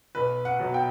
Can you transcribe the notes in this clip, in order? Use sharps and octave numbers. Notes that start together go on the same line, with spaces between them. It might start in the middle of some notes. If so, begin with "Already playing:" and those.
B1 B4
F#5
B2 F#3
G5